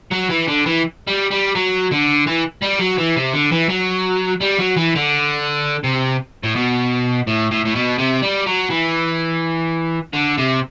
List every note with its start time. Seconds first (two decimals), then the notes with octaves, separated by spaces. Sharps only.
0.11 F#3
0.29 E3
0.48 D3
0.66 E3
1.08 G3
1.31 G3
1.55 F#3
1.91 D3
2.27 E3
2.63 G3
2.80 F#3
2.98 E3
3.16 C3
3.34 D3
3.52 E3
3.69 F#3
4.41 G3
4.59 F#3
4.77 E3
4.95 D3
5.84 C3
6.44 A2
6.56 B2
7.27 A2
7.51 A2
7.65 A2
7.75 B2
7.98 C3
8.22 G3
8.46 F#3
8.70 E3
10.13 D3
10.38 C3